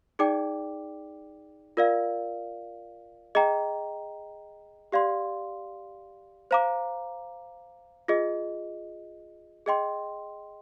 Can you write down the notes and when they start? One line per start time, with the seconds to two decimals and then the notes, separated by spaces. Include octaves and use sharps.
0.19 D#4 G#4 D5 G5 D6
1.77 F4 A#4 D5 F5
3.35 G#4 D#5 G5 A#5
4.92 G4 D5 F5 C6
6.51 C5 F5 A#5 D6
8.08 F4 G#4 D#5
9.66 G#4 D#5 G5 C6